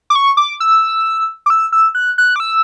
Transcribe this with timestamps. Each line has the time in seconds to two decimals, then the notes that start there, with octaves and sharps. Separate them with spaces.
0.10 D6
0.15 C#6
0.37 D6
0.60 E6
1.46 D6
1.50 E6
1.72 E6
1.95 F#6
2.18 F#6
2.36 D6
2.40 E6